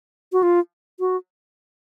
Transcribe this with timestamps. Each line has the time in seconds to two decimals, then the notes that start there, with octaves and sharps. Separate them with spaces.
0.32 F#4
0.43 F4
1.00 F#4